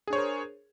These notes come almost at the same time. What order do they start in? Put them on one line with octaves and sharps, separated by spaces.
G#4 D4 C#5 C5 A#4